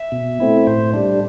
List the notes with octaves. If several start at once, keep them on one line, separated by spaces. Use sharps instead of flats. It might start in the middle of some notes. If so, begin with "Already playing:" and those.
Already playing: E5
B2
A3 C4 E4
A2 C5
G3 D4